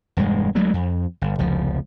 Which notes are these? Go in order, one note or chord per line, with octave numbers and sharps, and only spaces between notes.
E1 G2 G#3
D2 F#3 G#3 A3
F2
G1
F1 C#2 F3